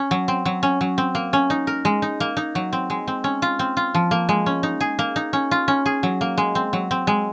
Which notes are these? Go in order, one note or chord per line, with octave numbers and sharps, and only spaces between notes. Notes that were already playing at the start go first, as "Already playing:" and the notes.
Already playing: C#4
F#3
C4
F#3
C#4
F#3
C4
A#3
C#4
D#4
A#4
G#3
D#4
A#3
D#4
F#3
C4
G#3
C4
C#4
F4
C4
F4
F3
A#3
G#3
C#4
D#4
G#4
A#3
D#4
C#4
F4
C#4
G#4
F#3
A#3
G#3
C4
F#3
C4
G#3